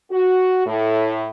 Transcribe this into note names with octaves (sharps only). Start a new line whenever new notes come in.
F#4
A2